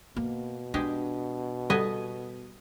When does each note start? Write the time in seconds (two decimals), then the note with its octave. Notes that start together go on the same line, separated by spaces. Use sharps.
0.16 B2 A#3
0.74 G#3 D4 G4
1.70 G3 B3 A4 D#5 G#5